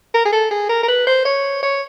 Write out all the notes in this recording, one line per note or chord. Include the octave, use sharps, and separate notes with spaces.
A#4
G#4
A4
G#4
A#4
A#4
B4
C5
C#5
C#5